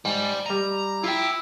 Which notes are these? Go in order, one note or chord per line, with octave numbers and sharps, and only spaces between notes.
G#2 G3
G3 D#5 A#5
E4 F4 G5